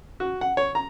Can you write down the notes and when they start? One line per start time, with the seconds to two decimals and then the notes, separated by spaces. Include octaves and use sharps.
0.20 F#4
0.41 F#5
0.57 C#5
0.75 A#5